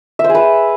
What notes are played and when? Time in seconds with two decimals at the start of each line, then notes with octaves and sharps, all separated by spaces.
0.19 E5
0.24 C5
0.29 G#4
0.35 B4